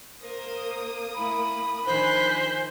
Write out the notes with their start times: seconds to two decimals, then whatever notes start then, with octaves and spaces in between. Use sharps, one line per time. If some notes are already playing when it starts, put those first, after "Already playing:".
0.23 A#3 A#4 C5 D#6
1.15 A3 E4 B5
1.86 D#3 F3 D4 C5 G#5 F#6 B6